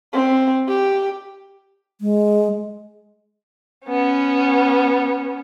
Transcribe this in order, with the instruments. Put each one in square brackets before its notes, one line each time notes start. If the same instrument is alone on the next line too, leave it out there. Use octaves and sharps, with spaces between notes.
[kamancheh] C4
G4
[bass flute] G#3
[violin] B3 C#4